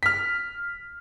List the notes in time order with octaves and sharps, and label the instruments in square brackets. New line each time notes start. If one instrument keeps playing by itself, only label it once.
[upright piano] F6 B6